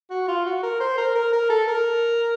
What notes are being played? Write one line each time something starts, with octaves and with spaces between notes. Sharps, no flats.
F#4
F4
F#4
A#4
C5
A#4
A#4
A#4
A4
A#4